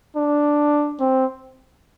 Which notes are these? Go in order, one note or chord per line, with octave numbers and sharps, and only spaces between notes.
D4
C4